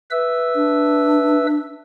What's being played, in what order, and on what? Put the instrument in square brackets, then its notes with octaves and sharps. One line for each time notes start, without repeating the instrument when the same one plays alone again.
[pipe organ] B4 E5 E6
[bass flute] D4